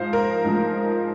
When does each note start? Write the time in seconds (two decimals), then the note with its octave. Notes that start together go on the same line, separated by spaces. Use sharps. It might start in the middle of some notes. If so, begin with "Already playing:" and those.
Already playing: G#2 F3 G#3 C5 F5
0.13 A#4
0.44 G#2 F3 G#3